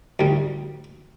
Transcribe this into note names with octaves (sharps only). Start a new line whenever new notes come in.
D2 G3